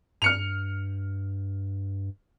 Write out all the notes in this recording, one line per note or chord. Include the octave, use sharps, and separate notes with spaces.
G2 F6 C#7 F7